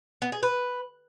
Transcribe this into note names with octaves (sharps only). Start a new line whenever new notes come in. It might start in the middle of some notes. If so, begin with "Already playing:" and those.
B3
G#4
B4